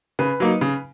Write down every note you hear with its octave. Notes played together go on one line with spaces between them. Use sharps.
C#3 B4
F#3 A#3 D#4
C#3